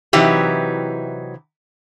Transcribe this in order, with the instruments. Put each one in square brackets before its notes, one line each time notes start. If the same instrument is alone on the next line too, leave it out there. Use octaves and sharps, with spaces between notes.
[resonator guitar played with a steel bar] C3 E3 F#3 D#4 G4